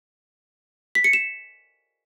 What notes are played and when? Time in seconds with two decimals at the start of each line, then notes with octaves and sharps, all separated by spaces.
0.95 B6
1.04 C#7
1.13 E7